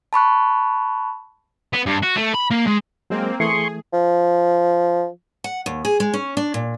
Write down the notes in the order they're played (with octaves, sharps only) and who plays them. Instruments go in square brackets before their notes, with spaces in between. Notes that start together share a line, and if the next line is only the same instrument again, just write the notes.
[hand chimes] A5 B5 C#6 F#6
[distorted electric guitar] B3
G2
F#4
A3
B5
A#3
G#3
[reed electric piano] F#3 G#3 [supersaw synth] A#3 C4
[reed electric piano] E3 A3 [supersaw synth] G#4 [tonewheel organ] C6 C#6
[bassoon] F3
[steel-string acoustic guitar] F#5
D#2
G#4
G#3
C#4
D4
A#2